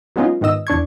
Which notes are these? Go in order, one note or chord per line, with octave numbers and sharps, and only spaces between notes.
F#3 G#3 B3 C#4 D#4 F4
G#2 D#3 B3 D#5 E6
E2 D4 C#6 G#6